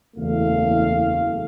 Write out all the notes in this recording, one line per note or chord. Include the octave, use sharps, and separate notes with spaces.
F#1 E2 A3 F5